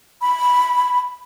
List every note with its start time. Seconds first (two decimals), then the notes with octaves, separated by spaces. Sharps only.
0.22 B5